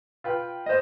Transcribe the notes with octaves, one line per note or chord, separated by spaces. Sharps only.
F4 B4 G5
C5 D#5